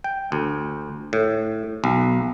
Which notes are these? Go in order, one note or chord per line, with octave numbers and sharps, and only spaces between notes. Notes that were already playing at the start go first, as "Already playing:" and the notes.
G5
D2
A2
B1